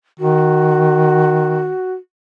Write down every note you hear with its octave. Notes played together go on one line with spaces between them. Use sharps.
D#3 F#4